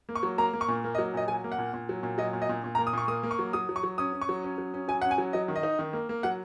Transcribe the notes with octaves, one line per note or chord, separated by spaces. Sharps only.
A#3
C#6
F#3
A#3 A#5
A#3
C#6
A#2
A#3
D#5
F#3
A#2 D#5
F#3 G#5
A#3
F#5
A#2
A#2
F#3
A#2
F#3 D#5
A#2
D#5
A#2
A#2
A#5
A#3
D#6
A#2 C#6
A#3 D#6
A#3
C#6
F#3
F#3 D#6
F#3
C#6
F#3
C#4 D#6
C#4
C#6
F#3
C#4
F#3
C#4
F#3 G#5
C#4 F#5
G#5
F#3
F#3 D#5
D#3
D#5
D#4
D#3
A#3
A#3
F#3 F#5